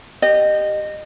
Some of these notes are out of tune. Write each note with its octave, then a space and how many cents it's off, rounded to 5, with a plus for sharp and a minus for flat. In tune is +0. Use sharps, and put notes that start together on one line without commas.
G4 +0 D#5 -25